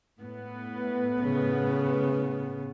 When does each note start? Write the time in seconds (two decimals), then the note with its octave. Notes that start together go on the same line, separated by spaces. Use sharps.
0.20 A2 B3
1.22 C#3